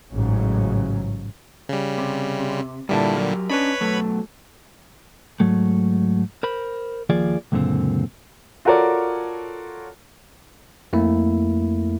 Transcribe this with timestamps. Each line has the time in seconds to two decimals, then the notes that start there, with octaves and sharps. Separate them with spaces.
0.12 A1 G#2 C#3 F#3
1.69 C#3 G3
1.98 C3
2.89 G2 A#2 D3 G3 E4 A5
3.17 F#3 G4 A#4
3.50 C#4 D4 B4 C#5 D#5 B5
3.81 B2 F#3 A3
5.40 G#2 F#3 A3
6.43 A#4 C5 B5
7.10 D#2 F3 A#3 F4 G#4 D5
7.52 C#2 F#2 A#2 D3 C4
8.65 F4 F#4 A4 A#4 C#5 D5
10.93 F2 A3 A#3 E4